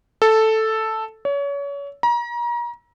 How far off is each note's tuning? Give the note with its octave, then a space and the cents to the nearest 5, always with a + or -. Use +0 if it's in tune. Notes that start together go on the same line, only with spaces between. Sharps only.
A4 +0
C#5 +30
A#5 +35